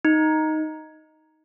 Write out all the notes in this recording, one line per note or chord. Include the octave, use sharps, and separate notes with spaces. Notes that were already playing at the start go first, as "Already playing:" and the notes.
D#4